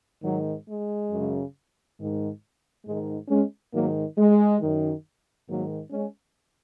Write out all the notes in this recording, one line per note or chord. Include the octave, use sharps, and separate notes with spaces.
G#2 D#3 F#3
G#3
F#2 C#3
G#2 D#3
G#2 D#3 G#3
G#3 C#4
G#2 D#3 F#3 A#3
G#3
F#2 D#3
G#2 D#3 F#3 A#3
G#3 C#4